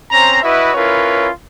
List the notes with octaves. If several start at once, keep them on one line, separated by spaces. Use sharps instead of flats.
C4 C#4 C5 A#5
E4 F#4 B4 D#5 E5
C#4 E4 F4 A#4 B4 C#5